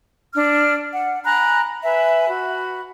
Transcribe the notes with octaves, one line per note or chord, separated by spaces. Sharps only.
D4 F6
F#5
G#5 A#5 B5 F#6
B4 E5 G#5 B5
F#4 B5